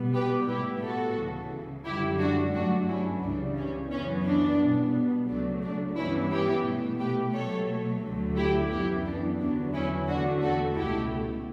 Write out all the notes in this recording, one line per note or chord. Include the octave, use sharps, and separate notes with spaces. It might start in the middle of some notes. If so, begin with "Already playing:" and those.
Already playing: B2 G3 B3
G4 B4
A2 G3 B3 E4 G4
F#4 A4
C#2 C#3 E3
F#2 D3 G3 E4 G4
D4 F#4
G2 F#3 A3 D4 F#4
C#4 E4
C#2 C#3 E3 G3 D4
C#4
F#2 E3 B3 C#4
D4
B2 G3 B3
C#2 C#3 F#3 A3 D4
D4
G2 E3 G3 B3 C#4 E4
E4 G4
B2 A3
G4 B4
B2 F#3 A3 A4 C#5
D2 D3 F#3 A3
E4 G4
F#2 E3 B3 E4 G4
D4
E2 D3 F#3 B3 D4
C#4 E4
E2 D3 A3 D4 F#4
F#4 A4
C#2 B2 A3 E4 G4